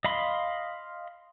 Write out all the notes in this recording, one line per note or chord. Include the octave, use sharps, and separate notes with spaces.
D#5 F5 B5 C6